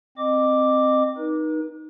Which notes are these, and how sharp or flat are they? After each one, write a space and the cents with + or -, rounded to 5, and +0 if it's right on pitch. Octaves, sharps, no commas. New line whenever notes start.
C4 +0 D#5 -25 D6 +0
D#4 +0 B4 -45